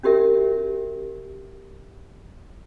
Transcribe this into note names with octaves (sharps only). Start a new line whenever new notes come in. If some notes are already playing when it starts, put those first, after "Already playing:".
C#4 F#4 G4 A#4 E5